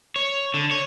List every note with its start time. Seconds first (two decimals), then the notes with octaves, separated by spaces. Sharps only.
0.16 C#5
0.54 D3
0.71 C#5